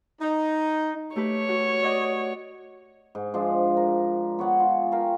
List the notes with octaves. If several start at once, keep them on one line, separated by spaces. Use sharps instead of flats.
D#4
A3 G4 B4 C#5
F#4
D5 D#5 F#5
G#2
F3 G#3 D4
A#4
B3 C#5 F#5 G#5
F4
A#4 F5 G5 A5